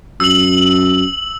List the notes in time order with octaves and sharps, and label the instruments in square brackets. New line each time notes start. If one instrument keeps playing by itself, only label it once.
[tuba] F#2 [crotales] E6 F#7